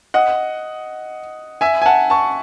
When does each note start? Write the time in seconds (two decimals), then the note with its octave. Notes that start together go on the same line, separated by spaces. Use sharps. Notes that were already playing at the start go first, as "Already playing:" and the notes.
0.14 D#5 F#5
1.61 E5 G#5
1.82 G#5
1.85 F#5 A5
2.10 A5 C#6